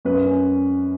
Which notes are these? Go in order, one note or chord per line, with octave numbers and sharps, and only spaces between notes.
F#2 B4
C#4